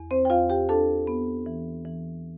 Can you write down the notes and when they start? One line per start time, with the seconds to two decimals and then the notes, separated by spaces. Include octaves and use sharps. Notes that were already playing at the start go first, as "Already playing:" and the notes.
Already playing: E2
0.11 C4 C5
0.25 G5
0.30 E2 F4 F5
0.50 G4 G5
0.69 D4 A4 A5
1.07 B3
1.46 E3
1.85 E3